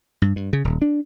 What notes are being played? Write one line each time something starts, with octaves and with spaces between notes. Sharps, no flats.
G2
G2
C#3
D#1
D4